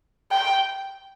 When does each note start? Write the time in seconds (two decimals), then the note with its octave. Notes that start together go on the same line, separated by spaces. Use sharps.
0.32 G5